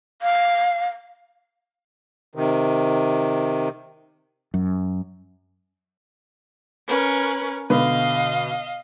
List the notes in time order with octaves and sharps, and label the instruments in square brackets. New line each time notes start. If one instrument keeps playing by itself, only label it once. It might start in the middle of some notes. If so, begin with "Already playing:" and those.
[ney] F5
[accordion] C3 D#3
[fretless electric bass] F#2
[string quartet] C#4 A#4 B4
[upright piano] B2 D3 B4 [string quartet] D#5 F5